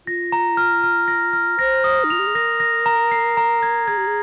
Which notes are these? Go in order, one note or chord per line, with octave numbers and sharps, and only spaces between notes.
F4 A#6
A#5
F6
F6
A#6
F6
C5 A#6
D#6
D#4
F4 F7
G4
G#4
A#4 A#6
A#6
A#5
C7
A#5
G#6
G#4 G#6
G4
G#4